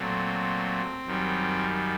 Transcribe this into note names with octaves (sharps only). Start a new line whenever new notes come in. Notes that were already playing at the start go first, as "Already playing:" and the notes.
Already playing: A#2 F#3 A3 C4
F#2 D#3 G3